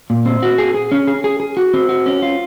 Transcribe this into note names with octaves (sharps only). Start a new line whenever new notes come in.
A#2
C4
F#4
G#4
G#4
C#4
G#4
G#4
G#4
F#4
C4
F#4
C#4
F4